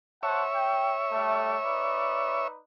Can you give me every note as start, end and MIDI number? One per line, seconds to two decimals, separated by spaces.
0.23 0.43 72
0.23 2.48 73
0.23 2.48 76
0.23 0.43 78
0.23 0.43 81
0.55 0.94 79
1.12 1.57 55
1.12 1.57 57
1.64 2.57 63
1.64 2.57 71
1.64 2.57 74